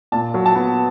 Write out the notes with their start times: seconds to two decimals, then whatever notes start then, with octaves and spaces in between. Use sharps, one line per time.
0.12 A#2 A5
0.34 F#3
0.46 A5
0.56 B3